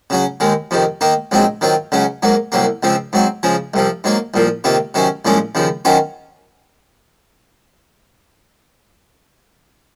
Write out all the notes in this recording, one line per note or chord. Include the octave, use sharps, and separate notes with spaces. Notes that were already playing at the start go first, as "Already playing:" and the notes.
C#3 F#3 C#4
D#2 D#3 G#3
F2 C3 D#3
D#3 A#3 D#4
A#1 G#2 F#3 C4 D#4
D#3 F#3 C4 F4
C#2 C#3 F#3 C#4
G#2 F#3 A#3
C2 C3 F#3 A#3
C#2 C#3 F3 C4
G#2 F#3 C4
C#3 F3 G#3
C2 C3 F3
G#2 F#3 A#3
C2 A#2 F3
C3 D#3 A#3 F4
C3 D#3 F#3 C#4
C2 A#2 F3 G#3 C#4
D#2 C#3 F3
D#3 F#3 C#4 F4 C5